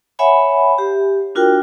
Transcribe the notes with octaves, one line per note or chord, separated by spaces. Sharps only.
C#5 E5 F#5 G#5 B5
G4
D4 F4 F#4 A#4 G5